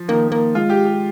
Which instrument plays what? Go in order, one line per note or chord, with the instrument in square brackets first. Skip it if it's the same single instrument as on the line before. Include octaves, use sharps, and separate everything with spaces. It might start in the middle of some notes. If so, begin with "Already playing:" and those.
Already playing: [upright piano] F3
[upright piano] D#3 [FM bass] A#3
[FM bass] A#3
[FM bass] G#3 [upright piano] F4
[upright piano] G4
G4